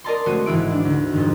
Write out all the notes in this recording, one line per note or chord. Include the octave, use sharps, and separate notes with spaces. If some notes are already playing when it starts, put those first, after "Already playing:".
A#4 D5 D#5 A5 A#5 C6
G#3 A3 C4 F#4 C5 D#7
G#1 E3 E4 D7
D4
D2
F2 G#2 D#3